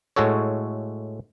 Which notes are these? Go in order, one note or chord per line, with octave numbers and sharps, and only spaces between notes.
A2 G#3 F#4 A4 C#5